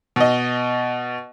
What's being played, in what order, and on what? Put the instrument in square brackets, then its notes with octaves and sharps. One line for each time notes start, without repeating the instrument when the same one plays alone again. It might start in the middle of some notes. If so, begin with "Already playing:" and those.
[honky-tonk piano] B2 D#5